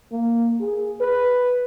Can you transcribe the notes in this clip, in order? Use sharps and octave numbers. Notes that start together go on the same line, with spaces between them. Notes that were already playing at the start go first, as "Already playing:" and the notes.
A#3
G#4
B4